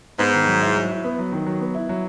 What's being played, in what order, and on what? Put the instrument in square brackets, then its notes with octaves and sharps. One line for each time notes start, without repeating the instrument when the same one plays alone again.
[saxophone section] G#2 [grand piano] B3
[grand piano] D#3
F#3
E4
F#3
E4
B3
F#3
D#3
F#3
B3
E4
F#3